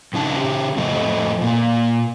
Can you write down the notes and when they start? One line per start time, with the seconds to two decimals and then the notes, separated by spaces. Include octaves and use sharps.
0.13 G2 C#3 D#4 A5
0.37 C#3 G4
0.76 F2 A2 A3 A4 C5 D#5
1.41 A#2 A#3